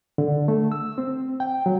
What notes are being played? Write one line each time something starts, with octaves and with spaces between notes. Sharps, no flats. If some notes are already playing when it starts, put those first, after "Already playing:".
D3
A3
E6
C4
G5
F#3